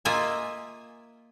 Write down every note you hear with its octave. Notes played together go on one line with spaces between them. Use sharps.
A#3 F4 D#5 E5 G#5